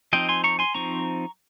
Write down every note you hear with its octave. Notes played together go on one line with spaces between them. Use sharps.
F3 C4 D#4 D#5 G5
G#5 C6
A#5 C#6
G#5 C6
F3 C4 D#4 A#5 C#6